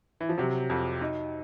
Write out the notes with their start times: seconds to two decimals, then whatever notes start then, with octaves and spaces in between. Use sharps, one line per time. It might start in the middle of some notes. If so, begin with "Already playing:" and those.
0.21 E3
0.29 F3
0.38 C3 F#3
0.70 F2
1.01 D#4